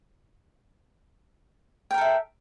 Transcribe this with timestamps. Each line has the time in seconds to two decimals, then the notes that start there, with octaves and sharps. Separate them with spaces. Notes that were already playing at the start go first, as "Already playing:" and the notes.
1.91 G5
1.94 A#4
1.98 A4
2.01 E5